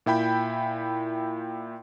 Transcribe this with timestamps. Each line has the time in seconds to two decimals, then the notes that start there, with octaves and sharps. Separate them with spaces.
0.06 A#2 E4 G5 B5 G6